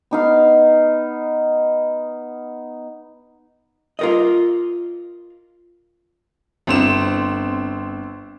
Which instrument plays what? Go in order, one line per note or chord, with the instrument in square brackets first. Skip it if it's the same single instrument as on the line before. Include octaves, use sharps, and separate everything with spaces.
[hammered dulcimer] B3 D#4 F5
[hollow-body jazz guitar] F4 A#4 D#5
[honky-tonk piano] G1 C4 E7